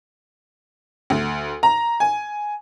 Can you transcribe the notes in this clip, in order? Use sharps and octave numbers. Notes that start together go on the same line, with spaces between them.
D2
A#5
G#5